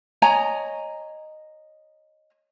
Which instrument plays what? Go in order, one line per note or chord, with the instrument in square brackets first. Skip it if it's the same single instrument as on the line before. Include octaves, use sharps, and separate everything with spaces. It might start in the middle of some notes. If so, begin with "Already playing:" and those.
[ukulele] C#5 D#5 G#5 A#5